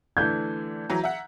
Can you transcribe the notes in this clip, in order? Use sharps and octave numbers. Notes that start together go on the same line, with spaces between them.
D3 E3 A3 G6 G#6
E3 F#3 A#5
E5 F#5